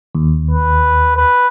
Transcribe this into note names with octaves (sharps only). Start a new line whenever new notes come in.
D#2
B4
B4